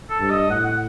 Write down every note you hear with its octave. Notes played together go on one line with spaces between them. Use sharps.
A4
G2
D#5
A2 F#5
F#5